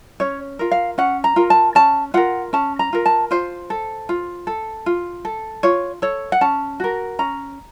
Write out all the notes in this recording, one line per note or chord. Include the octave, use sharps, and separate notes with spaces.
C#4 C#5
F4 A#4
F5
C#4 F#5
A#5
F4 A#4
A5
C#4 A5
F4 A#4 F#5
C#4 A5
A#5
F4 A#4
A5
F4 C5
A4
F4
A4
F4
A4
F4 C#5
A4 C#5
F#5
C#4 A5
F#4 A#4
C#4 A#5